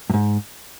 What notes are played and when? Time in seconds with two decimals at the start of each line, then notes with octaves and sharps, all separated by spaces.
0.10 G2
0.14 G#2